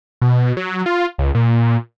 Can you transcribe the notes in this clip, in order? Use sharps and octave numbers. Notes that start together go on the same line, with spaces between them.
B2
F#3
F4
C#2
A#2